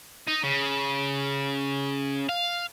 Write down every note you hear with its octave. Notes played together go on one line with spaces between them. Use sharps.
D#4
C#3
F5